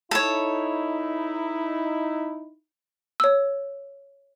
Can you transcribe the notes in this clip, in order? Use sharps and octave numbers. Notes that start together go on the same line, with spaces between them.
D#4 E4 A4 C#5
C#5 E6